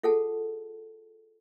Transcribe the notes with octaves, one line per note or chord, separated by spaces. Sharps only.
F4 G#4 A4 F#5 A5